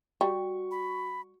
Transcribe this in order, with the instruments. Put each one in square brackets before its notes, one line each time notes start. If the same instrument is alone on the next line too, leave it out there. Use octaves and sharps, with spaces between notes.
[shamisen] G3 [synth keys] F#4 C#6
[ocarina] B5